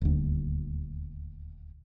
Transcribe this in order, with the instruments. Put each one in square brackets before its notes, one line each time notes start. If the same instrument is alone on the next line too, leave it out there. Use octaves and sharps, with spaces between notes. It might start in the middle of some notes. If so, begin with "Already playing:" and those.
[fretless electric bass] D#1 D2